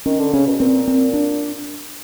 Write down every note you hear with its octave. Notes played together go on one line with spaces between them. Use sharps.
D#3 C#4
D3
C#3 C#4
B2
A#2 C4
C4
D4